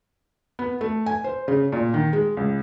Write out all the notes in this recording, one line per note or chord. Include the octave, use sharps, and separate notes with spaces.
B3
A3
G#5
C5
C#3
A#2
D#3
G#3
C#2